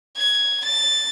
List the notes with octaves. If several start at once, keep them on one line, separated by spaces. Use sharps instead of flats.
G#6
A6